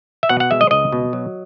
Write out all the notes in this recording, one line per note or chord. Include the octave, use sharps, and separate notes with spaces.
E5
B2 F#5
F#5
G#3 E5
D#5
C#2 D#5
B2
F#3